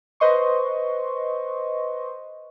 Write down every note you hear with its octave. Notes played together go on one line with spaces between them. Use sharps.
B4 C5 D#5 C6 C#6